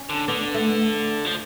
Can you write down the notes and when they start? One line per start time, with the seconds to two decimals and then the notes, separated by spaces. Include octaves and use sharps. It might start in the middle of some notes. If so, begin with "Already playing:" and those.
Already playing: C#4
0.09 D3
0.28 D3 B3
0.54 A3
1.25 F3